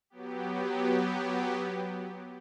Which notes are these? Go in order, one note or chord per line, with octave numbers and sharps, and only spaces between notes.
F#3 B3 G4